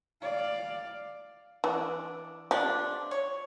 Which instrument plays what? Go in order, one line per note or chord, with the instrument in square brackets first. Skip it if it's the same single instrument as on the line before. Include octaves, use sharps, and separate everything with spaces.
[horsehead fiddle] D5 F5
[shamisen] E3 [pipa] D4
[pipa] F3 A3 D4 [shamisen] G4
[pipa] C#5